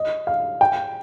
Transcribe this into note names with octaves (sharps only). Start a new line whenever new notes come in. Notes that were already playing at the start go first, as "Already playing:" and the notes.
Already playing: D#5
F5
G5